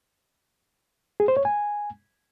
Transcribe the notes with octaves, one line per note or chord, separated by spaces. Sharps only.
G#4
C5
C#5
G#5